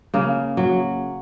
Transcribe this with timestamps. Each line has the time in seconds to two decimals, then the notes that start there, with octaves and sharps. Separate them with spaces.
0.14 C#3 A#3
0.57 F#3